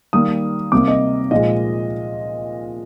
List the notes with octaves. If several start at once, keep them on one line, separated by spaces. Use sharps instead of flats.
D#3 G3 A#3 D#6
C3 G3 A#3 D6
D#5
A#2 F3 G#3 D#5